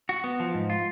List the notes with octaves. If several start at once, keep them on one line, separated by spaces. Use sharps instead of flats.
F#4
B3
F3
G#2
F4